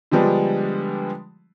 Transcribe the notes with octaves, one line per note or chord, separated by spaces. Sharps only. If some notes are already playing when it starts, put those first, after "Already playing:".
D3 F3 G3 G#3 B3 D4